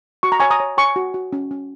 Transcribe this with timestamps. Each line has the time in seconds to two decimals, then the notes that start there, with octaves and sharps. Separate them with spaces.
0.23 F#4 C#6
0.32 A#5
0.40 C#5 G#5 C#6
0.51 A#5 D#6
0.60 C#5
0.77 C#5 G#5 C#6
0.96 F#4
1.14 F#4
1.33 C#4
1.51 C#4